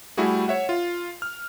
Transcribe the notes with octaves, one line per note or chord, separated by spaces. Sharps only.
G3 A3 E4 F#4 G#4
C#5 E5 F#5
F4
F6